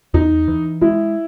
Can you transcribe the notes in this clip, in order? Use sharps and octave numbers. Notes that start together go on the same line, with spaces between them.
E2 D#4
E3
G#3 E4